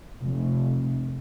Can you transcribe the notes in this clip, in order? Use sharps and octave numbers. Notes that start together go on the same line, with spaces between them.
F1